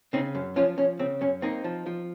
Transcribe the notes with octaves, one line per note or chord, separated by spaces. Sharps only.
C#3 C4 D#4
F#2
F3 C#4 F4
F3 C#4
C#3 C4
F#2 C#4
A#3 C4 D#4
F3
F3